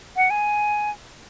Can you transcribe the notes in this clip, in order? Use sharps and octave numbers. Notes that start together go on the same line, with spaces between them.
F#5
G#5